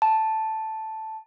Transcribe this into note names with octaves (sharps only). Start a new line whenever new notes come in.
A5